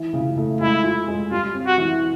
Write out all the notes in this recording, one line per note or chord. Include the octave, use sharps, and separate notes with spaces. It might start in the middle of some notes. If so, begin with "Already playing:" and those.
Already playing: E3
C#3
A3
G#3 E4
F4
G#3
G3 F4
C4
F#4
E3